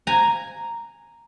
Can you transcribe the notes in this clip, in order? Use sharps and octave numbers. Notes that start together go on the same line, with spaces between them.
G#5 A#5